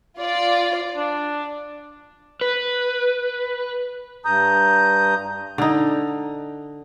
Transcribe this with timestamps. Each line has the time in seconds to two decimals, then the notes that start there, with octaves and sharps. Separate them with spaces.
0.19 F4 D5
0.96 D4
2.41 B4
4.25 G2 A#5 D#6 G6
5.58 D3 D#4